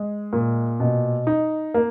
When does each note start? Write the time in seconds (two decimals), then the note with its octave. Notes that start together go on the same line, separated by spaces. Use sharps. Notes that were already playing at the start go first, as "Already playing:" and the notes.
Already playing: G#3
0.33 A#2
0.80 B2
1.27 D#4
1.74 A#3